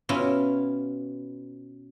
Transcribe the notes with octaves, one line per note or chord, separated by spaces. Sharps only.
B2 C#4 E4 F4